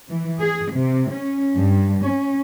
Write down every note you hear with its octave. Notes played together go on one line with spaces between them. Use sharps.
E3
G#4
C3
C#4
G2
C#4